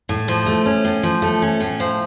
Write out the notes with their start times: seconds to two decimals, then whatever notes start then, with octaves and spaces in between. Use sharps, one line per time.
0.09 A2
0.28 F3
0.46 A3
0.66 C#4
0.85 A2
1.03 F3
1.22 A3
1.42 C#4
1.60 A2
1.80 F3